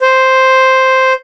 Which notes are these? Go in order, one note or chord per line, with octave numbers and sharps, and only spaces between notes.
C5